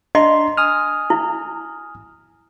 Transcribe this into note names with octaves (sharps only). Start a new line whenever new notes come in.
D4 D#5 A#5 C6
G#5 D#6 F6
E4